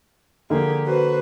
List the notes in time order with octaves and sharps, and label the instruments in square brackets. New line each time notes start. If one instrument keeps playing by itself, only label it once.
[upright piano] D3 A#3 [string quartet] F3 G4 G#4
[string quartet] F#4 B4 C5